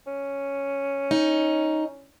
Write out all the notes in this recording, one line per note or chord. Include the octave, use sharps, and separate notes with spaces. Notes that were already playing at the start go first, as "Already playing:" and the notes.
C#4
D#4